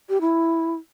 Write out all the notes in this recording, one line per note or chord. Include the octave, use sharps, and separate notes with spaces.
G4
E4